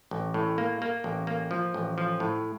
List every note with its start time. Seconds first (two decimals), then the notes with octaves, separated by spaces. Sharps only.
0.11 A1
0.34 A2
0.58 A#3
0.82 A#3
1.04 A1
1.27 A#3
1.51 F3
1.74 A1
1.98 F3
2.20 A2